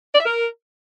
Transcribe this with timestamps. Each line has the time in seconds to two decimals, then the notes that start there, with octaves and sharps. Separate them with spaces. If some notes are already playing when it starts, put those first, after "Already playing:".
0.15 D5
0.20 E5
0.26 A#4